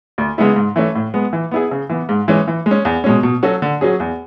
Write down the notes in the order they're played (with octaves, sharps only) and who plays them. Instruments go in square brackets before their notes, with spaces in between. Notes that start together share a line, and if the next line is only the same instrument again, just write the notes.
[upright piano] D2
C#3 G#3 B3 E4
G#2
E3 A3 C#4
A2
G#3 B3
E3
B3 E4 G#4
C#3
E3 B3
G#2
E3 G#3 C#4
E3
G#3
C#4
E2
B2 G#3 C#4
B2
F#3 C#4 F#4 A4
D3
F#3 C#4 G#4
E2